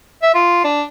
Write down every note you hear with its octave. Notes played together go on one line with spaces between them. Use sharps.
E5
F4
D4